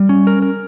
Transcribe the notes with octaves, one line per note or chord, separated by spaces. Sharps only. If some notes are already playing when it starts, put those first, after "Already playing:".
Already playing: G3
C#4
A#4
A#4